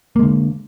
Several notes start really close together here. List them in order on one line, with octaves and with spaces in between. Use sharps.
A#3 G#3 D3